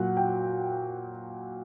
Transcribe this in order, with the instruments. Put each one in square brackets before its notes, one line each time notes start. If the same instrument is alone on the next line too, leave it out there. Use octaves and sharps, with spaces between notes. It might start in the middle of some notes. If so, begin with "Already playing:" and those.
Already playing: [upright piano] A#2 F#3 F#5
G5